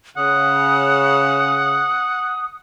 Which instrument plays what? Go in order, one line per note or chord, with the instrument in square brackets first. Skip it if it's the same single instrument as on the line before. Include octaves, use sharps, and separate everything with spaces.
[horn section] C#3 [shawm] F#5 [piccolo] D#6